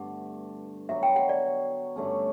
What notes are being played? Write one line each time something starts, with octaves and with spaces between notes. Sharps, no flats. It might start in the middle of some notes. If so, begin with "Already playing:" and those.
Already playing: G2 D3 A3 B3 F#5
F#3 B3 F#4 E5
G5
F#5
D5
G2 D3 A3 C#4